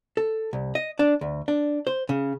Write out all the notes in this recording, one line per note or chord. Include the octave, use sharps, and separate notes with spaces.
A4
C2
D#5
D4
D2
D4
C5
C#3